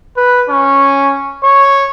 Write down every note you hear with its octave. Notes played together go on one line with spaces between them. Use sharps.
B4
C#4
C#5